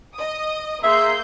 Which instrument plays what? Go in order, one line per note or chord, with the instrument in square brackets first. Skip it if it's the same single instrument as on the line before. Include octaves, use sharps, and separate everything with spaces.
[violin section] D#5 D#6
[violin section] A#3 G6 [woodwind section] G#4 C6 [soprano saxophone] E5 [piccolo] E6